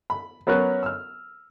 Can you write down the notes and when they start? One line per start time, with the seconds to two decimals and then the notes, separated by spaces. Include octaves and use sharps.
0.10 B5
0.47 F#3 B3 C#4 A#4 C#5 F#6
0.83 E6 F6